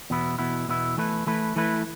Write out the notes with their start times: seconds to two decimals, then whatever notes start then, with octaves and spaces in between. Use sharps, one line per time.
0.10 E2 B2 B3 E4
0.38 E2 B2 B3 E4
0.68 E2 B2 B3 E4
0.97 E3 A3 E4 B4
1.26 E3 A3 E4 B4
1.56 E3 A3 E4 B4